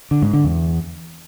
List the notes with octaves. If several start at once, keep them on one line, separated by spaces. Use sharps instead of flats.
D3
G#2
D3
E2